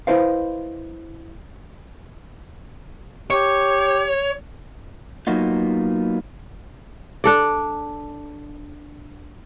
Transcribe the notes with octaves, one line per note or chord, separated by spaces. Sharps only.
E4 B4 C5 D#5 F5
G4 C#5
F#3 A#3 B3 D#4 F4
D4 A4 D5